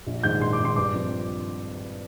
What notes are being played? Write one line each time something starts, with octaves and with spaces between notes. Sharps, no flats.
A#1
G#2 D#3 G6
A#1 C6
D6
G#2
D#3 C6
G2 D6
F3 C4